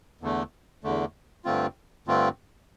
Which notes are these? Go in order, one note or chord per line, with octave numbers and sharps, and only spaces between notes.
E2 D3 A3
E2 D3 A3
G2 D3 A3 C4 F4
G2 D3 A3 C4 F4